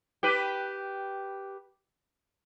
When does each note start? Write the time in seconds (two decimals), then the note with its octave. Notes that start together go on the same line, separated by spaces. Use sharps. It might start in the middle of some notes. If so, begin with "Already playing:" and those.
0.23 G4 B4